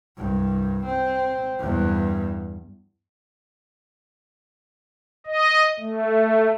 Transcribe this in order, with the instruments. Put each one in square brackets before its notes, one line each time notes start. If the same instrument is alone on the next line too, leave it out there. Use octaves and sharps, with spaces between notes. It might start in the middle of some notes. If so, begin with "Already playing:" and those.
[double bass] C2 G2
C4
E2 G2
[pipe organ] D#5
A3